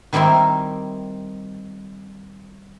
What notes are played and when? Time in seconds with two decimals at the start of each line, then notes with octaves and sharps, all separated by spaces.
0.13 D#3 G3 C4 E4 A#4